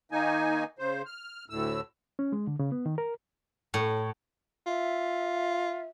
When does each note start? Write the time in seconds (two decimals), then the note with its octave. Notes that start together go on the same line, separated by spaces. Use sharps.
0.12 D#3 A#3 D#4 G#5
0.79 C#3 C5
1.06 F6
1.50 D2 A2 E6
2.19 C#4
2.32 G#3
2.47 D3
2.59 C#3
2.72 B3
2.86 D#3
2.98 A#4
3.74 A2
4.66 F4 E5